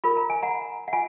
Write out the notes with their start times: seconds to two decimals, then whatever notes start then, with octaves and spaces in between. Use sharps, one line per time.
0.04 F4 A#4 B5
0.17 A#5
0.30 G#5
0.43 F#5 A#5
0.88 F#5
0.93 F4 G#5